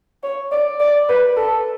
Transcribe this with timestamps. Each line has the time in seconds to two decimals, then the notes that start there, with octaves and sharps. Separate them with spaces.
0.23 C#5
0.52 D5
0.80 D5
1.09 B4
1.37 A4